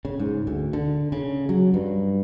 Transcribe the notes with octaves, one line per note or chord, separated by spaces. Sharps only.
C#3
G#2
D2
D3
C#3
F#3
G2